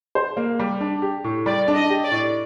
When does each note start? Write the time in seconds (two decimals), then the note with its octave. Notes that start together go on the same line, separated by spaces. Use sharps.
0.15 C5
0.37 A#3
0.60 G3
0.81 D4
1.02 G4
1.24 A2
1.46 G3 D5
1.68 D4
1.75 D#5
1.90 G4
2.05 D5
2.11 A2